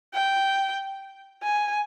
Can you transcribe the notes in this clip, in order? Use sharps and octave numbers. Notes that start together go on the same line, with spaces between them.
G5
G#5